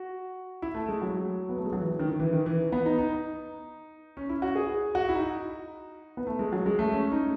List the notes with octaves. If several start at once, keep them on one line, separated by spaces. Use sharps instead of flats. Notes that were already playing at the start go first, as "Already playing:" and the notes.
Already playing: F#4
E4
A3
G#3
F#3
B3
A3
G#3
F#3
E3
D#3
D#3
E3
D#3
E3
B3
D#4
D#4
C#4
E4
F#4
G#4
F#4
E4
D#4
B3
A3
G#3
F#3
G#3
A3
C#4
D#4